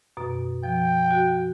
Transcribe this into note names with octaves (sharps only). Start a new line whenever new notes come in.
F#2 B2
F3 G5
F#4